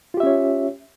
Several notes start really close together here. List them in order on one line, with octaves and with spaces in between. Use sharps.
F4 G4 E5 C#4 C#5